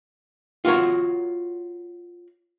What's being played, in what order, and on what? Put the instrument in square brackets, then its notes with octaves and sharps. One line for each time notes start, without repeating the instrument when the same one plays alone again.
[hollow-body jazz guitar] F4 F#4 A#4 C#5